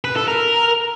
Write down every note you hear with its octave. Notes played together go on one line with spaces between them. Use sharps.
B4
A4
A#4